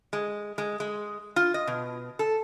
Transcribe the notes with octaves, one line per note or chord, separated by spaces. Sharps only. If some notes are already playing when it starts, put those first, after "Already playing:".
G#3
G#3
G#3
F4
D#5
B2
A4